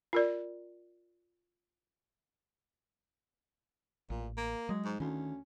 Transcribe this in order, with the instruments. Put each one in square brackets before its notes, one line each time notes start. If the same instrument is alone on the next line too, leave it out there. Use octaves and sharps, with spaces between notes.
[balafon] F4 A#4 D5
[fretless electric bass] A1 [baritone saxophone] A#2
[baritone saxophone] A#3
[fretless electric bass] F#3 [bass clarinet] G#3
[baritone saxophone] G#2
[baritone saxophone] D2 [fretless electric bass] D#3 [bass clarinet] C#4